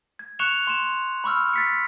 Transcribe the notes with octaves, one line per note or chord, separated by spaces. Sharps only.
G#6
C#6 F#6 C#7 E7 F7 G7
C6 E7
B5 C#6 E6 F6
A6 B6 C#7